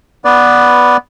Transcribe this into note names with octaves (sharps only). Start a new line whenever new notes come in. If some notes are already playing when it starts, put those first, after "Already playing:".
B3 B4 D5